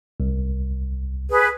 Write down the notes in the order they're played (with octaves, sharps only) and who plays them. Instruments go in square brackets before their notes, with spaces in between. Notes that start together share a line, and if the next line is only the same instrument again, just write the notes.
[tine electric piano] C2
[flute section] G#4 B4